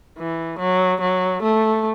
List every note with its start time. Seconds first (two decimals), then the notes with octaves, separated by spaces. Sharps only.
0.19 E3
0.59 F#3
1.01 F#3
1.43 A3